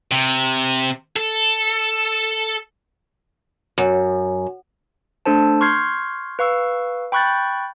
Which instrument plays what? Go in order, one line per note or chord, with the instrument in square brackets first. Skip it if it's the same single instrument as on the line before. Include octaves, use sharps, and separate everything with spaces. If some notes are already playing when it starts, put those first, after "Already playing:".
[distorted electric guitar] C3
A4
[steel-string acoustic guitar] F#2
[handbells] A3 D4 A4 C5 A5
C6 C#6 F6 G6 G#6 C7
B4 F5 C#6 E6
G5 B5 C#6 F#6 G6 A6